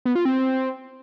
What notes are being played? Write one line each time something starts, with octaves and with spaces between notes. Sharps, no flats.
B3
F4
C4